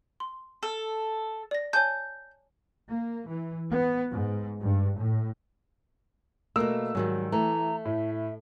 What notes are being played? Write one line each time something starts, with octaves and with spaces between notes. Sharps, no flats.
C6
A4
D5 A#6
C#5 G#5 A5 G6
A#3
E3
B3
G#2
G2
A2
B2 A3 A#3 E6
G#2 D#3 F#3 G3
E3 A3 A#5
A2 E5